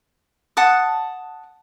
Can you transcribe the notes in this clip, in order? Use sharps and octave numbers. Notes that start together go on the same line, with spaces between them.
F#5 A5 D#6